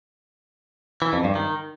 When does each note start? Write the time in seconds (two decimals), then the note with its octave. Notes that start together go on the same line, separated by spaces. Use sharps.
1.02 E3
1.13 F2
1.24 G2
1.35 D#3